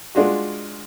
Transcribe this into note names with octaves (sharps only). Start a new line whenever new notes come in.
G#3 D4 F4 F#4